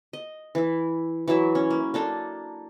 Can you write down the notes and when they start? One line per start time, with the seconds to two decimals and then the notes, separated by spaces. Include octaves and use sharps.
0.13 D#5
0.55 E3 E4
1.28 E3 F#3 E4 E5
1.55 C#4
1.70 A#3
1.94 A#3 D4 A4